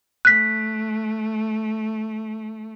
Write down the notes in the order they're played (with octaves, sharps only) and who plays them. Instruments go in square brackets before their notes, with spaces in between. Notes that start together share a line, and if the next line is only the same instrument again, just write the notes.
[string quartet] A3 [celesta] F#6 B6